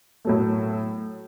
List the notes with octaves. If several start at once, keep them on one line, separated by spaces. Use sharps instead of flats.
A2 F#3 A3